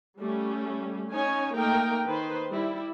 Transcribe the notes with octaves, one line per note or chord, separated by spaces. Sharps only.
G3 A3 C#4
C#4 D#4 C#5 G#5
A3 A#3 D#4 A#4 G5
D#3 B4 C5
G3 E4